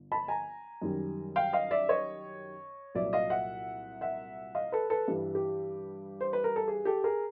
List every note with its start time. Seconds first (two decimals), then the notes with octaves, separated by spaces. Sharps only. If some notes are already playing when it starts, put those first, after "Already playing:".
Already playing: G1
0.12 A5 B5
0.28 G#5 A#5
0.82 F#2 D#3 G3
1.36 F5 G5
1.53 D#5 F5
1.71 D5 E5
1.89 C#5 D#5
2.95 C2 A#2 F#3 D5 E5
3.13 D#5 F5
3.30 E5 F#5
4.01 E5 F#5
4.55 D#5 F5
4.72 A4 B4
4.90 A4 B4
5.08 G2 E3 G3
5.35 G4
6.21 C5
6.33 B4
6.44 A#4
6.56 A4
6.68 G#4
6.85 G4 A4
7.04 G#4 A#4